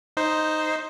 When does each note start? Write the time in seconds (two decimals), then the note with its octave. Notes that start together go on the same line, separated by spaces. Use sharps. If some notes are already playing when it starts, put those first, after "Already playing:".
0.17 D#4 C5